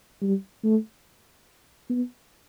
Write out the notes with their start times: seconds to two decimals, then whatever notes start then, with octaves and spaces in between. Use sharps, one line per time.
0.22 G3
0.64 A3
1.90 B3